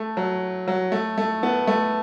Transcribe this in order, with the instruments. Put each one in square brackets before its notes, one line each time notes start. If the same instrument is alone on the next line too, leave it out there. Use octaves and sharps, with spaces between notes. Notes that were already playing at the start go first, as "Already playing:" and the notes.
Already playing: [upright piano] A3
F#3
F#3
A3
A3
B3
A3